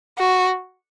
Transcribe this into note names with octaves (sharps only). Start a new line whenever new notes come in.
F#4